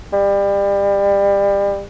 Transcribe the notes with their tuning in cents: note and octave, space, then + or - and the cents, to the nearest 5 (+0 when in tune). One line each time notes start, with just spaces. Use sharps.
G3 +30